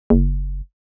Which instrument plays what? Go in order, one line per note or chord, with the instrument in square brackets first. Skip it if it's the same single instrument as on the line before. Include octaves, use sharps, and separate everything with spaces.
[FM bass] F#1